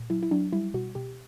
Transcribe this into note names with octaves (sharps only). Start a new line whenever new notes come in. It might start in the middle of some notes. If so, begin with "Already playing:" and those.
Already playing: A#2
F#3 E4
E4
F#3 D4
G3 E4
B2 F#4
B2 G4